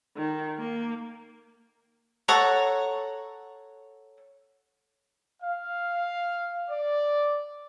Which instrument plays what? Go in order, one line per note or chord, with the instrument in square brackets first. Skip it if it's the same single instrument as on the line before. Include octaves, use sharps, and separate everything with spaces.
[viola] D#3
A#3
[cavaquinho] A4 C#5 F#5 A#5
[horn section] F5
D5